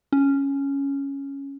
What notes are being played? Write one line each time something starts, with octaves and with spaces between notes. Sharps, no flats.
C#4